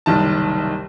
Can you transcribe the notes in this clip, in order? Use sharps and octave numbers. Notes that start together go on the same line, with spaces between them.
F#1 C2 D#3 A5